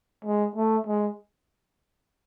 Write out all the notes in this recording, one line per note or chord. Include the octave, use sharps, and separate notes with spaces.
G#3
A3
G#3